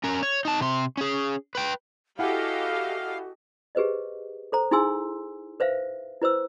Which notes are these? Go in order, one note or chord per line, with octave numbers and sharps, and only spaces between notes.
C#4 A#4
C#5
D#4 A5
C3 C6
C#4 G#4
B4 G5
E4 F#4 G4 A4 D#5 F5 F#5 G#5
G4 G#4 B4 C5 D#5
A4 C5 A#5
D#4 E4 G#4 G#5 C6 E6
B4 C5 E5 F5
E4 B4 C5 E6